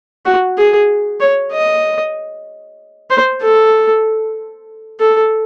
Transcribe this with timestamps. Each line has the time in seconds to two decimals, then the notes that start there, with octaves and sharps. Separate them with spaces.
0.26 F#4
0.58 G#4
1.21 C#5
1.52 D#5
3.10 C5
3.42 A4
5.00 A4